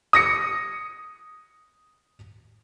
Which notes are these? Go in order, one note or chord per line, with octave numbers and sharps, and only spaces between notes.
D#6 A#6 C#7